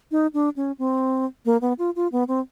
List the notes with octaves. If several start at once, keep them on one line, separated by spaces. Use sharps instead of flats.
D#4
D4
C#4
C4
A#3
B3
F4
F4
B3
C4